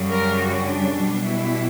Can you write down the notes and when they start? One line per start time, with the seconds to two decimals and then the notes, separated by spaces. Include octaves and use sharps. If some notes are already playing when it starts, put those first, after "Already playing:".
Already playing: F#2 C#3 G3
0.09 A#4
0.38 F#4
0.65 D4
0.94 B2 G3
1.23 E4